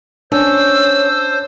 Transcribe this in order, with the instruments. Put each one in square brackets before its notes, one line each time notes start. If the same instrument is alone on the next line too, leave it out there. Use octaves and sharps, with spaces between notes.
[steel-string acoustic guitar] C#4 [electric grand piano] D4 [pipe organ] C5 [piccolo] E6